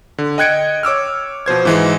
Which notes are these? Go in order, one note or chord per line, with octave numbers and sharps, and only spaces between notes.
D3
D#5 G5 F#6 G#6 C#7 D7
C#5 D6 E6 F6
B2 F3 C5 G#6
G#2 E3 G#3